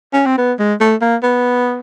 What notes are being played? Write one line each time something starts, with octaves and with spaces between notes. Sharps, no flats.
C#4
C4
B3
G#3
A3
A#3
B3